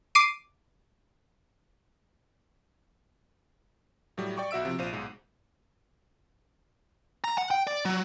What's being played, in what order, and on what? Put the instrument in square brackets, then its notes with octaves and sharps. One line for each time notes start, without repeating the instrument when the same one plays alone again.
[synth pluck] D6 C7 D7 D#7
[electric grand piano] A2 F#3 G3
D5 G5 C#6 D6
B1 F#4 E5 E6 D7
C3 F3
A#1 F4 C5 D#7
B1 G#2
[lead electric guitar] A#5
F#5
G5
D5
F#3